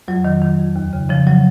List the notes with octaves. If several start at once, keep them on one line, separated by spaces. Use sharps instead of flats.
F2 F#3
D#3
D#3
F2
D#2
C#3
C#3 F3
F#3